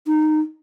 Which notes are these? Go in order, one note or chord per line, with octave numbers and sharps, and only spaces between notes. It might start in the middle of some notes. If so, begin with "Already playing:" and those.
D#4